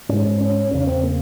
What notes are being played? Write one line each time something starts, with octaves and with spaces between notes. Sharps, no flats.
G#2 C#4
C#4
E2 C#3 C#4
C4
A#3